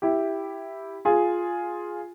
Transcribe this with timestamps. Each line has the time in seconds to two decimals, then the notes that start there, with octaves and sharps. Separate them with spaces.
0.02 E4 G4
1.05 F4 G#4